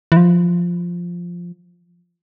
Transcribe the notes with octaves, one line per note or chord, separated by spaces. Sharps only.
E3
F3